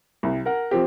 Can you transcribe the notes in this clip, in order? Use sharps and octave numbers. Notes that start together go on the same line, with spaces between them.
C2
A#4 F#5
F3 C4 G4